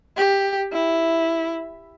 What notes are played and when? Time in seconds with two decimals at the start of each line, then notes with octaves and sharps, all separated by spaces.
0.17 G4
0.72 E4